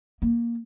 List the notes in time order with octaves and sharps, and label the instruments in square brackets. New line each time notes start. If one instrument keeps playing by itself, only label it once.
[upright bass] A#3